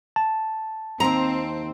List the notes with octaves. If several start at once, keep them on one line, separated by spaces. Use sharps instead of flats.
A5
D#2 C4 A#5